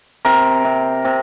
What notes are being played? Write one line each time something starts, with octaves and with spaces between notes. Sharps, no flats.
C3 A#4
C3
C3